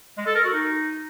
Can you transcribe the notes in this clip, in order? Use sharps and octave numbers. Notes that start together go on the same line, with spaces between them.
G#3
A4
A#4
F#4
D#4